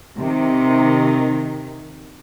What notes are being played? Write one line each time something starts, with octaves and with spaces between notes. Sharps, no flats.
C3 D#3